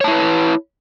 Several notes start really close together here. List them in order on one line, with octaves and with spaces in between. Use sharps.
C#5 A5 E4 B4